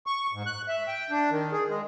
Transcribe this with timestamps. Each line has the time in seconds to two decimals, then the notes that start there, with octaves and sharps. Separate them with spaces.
0.07 C#6
0.33 G#2
0.46 F#6
0.68 E5
0.88 G5
1.11 D4
1.30 D#3
1.52 G#4
1.68 G#3